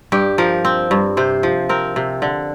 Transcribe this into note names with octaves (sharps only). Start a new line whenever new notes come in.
G2 G4
F3 A#4
C4
G2
C3 C5
F3
C4 A#4
C3
D3